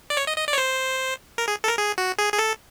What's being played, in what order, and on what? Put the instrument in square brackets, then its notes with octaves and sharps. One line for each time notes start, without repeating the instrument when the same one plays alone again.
[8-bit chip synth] D5
C#5
D#5
D#5
D5
C#5
C5
A#4
G#4
A4
A#4
G#4
F#4
G#4
G#4
A4